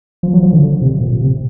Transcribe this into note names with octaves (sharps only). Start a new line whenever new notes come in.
F3
F#3
F3
D3
C3
A#2
C3